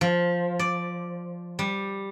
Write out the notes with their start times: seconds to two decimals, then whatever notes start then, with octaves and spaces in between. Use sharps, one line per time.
0.01 F3
0.59 D5
1.59 G3